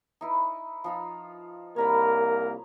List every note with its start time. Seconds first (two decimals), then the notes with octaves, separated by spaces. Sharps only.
0.21 D#4 E4 B4
0.84 F3 D#4 F4
1.76 C2 A#3 A#4 C#5 A#5 B5